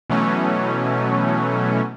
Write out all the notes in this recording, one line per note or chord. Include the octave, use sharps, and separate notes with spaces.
B2 E3 F#3 A3 C#4